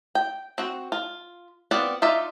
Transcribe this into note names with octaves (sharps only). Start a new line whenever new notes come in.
G5
C4 F#4
F4
B3 C4 F4 D5 F#5
D#4 F4 D5 E5